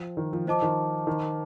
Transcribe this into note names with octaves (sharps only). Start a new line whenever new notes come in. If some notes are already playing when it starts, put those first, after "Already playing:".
Already playing: F3 C5 G5
D#3
F3
F3 C5 D#5 A5 D6
D#3
D#3